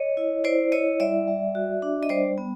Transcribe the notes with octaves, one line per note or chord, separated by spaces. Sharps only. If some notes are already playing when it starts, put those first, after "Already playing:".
Already playing: C#5 D#5
E4
E4 C5 D5
E4 C#5 D#5
G3 D5 E5
G3
F#4
D4
D#5
G3 C5 D5
B3